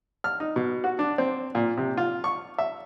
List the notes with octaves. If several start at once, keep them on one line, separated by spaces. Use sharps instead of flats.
F6
D#4
B2
F#4
D4
C4
A#2
C3
F4
C#6
E5